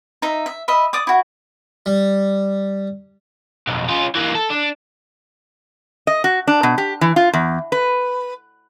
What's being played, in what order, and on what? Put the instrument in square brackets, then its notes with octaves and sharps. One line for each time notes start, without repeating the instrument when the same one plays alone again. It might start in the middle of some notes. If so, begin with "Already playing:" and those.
[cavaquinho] D#4 E5
E5
D#5 E5 B5
D5 D6 D#6
E4 F#4
[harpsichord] G3
[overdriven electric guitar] B1 F2
C#4 F4
E3 A#3
A4
D4
[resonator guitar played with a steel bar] D#5
F#4
D4
B2
G4
E3
F4
E2
B4